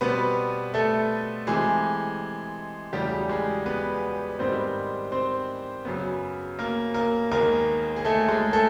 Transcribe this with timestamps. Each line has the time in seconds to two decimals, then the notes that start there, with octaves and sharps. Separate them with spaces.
0.01 B2 G3 B3 C4 B4
0.74 A3 A4
1.47 C3 E3 G#3 A3 C4 G#4
2.93 E2 C#3 F#3 G3 A3 G4
3.29 G#3 G#4
3.66 B3 B4
4.39 G#2 D#3 G3 B3 C4 C5
5.12 C4 C5
5.85 F#2 C#3 F#3 B3
6.59 A#3 A#4
6.94 A#3 A#4
7.31 D#2 D#3 G#3 A#3 B3 A#4
7.96 G#4
8.05 A3 A4
8.28 G#3 G#4
8.53 A3 A4